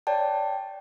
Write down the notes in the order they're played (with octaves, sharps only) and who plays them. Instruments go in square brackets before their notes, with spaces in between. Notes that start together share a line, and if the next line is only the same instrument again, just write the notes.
[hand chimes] C#5 D5 G5 A5